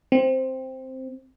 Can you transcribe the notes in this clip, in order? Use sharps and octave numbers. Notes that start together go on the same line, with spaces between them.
C4